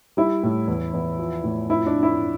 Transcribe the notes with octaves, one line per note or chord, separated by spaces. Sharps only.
G3 E4
A2
E2
E2
F3
A2
F2 E4
D4
F2
E4